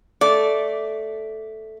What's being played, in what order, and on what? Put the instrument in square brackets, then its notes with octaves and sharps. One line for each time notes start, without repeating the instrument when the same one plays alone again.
[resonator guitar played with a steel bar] A3 D5